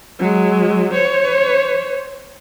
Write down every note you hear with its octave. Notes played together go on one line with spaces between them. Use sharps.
F#3 G#3
C5 C#5